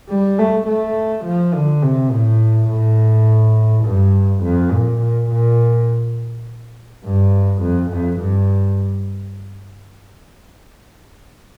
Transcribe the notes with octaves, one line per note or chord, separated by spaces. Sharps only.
G3
A3
A3
F3
D3
C3
A2
A2
G2
F2
A#2
A#2
A#2
G2
F2
F2
G2